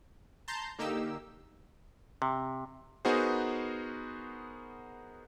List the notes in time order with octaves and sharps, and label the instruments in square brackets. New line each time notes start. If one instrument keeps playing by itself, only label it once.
[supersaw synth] A5 A#5 C6 G6
D3 A#3 D#4 G4 E6
[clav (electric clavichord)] C3
[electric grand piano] B3 D#4 F#4 G#4 A#4 C5